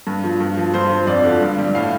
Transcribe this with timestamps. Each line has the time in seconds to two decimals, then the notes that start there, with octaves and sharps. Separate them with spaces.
0.07 G2
0.24 F3
0.41 G2
0.57 F3
0.74 G2 C5
0.91 F3
1.07 F2 D5
1.24 D3 F3
1.41 G2
1.58 G3
1.75 A2 F5